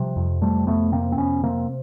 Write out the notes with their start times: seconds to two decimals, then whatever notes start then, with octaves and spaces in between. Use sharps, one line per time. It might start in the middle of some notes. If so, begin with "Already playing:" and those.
Already playing: C3 F3 G3
0.16 F2
0.42 C3 G3 A3
0.67 F2 A3 B3
0.92 C3 A#3 C4
1.12 C4
1.17 F2 B3 C#4
1.43 C3 A#3 C4